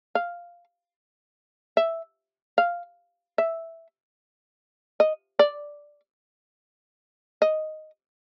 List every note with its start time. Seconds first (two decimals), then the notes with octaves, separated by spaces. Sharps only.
0.15 F5
1.77 E5
2.58 F5
3.38 E5
5.00 D#5
5.39 D5
7.42 D#5